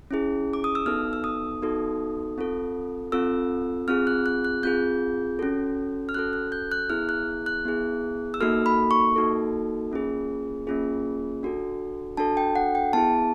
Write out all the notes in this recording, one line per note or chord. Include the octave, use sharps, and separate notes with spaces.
C#4 E4 G#4
D6
D#6
E6
B3 D#4 F#4 A4 F6
E6
D#6
B3 D#4 F#4 A4
C4 F4 A4
C4 F4 A4 E6
C4 F4 G#4 F6
F#6
F#6
F#6
C4 F4 G#4 G6
C#4 F#4 A4
F6
C#4 F#4 A4 F#6
F#6
G6
F#6
B3 E4 G#4 F6
F#6
F#6
B3 E4 G#4
E6
A#3 D#4 F#4 A4 F6
B5
C#6
A#3 D#4 F#4 A4
A#3 C#4 F4 G#4
A#3 C#4 F4 G#4
D4 F#4 A4
D4 F#4 A4 A5
G5
F#5
G5
B3 E4 G#4 A5